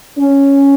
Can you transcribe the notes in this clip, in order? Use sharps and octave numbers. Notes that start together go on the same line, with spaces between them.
C#4